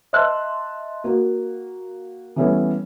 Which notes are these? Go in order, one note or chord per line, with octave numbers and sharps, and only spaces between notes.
D#5 E5 A5 C6 E6 F#6
A#3 F#4
E3 G3 A3 B3 C#4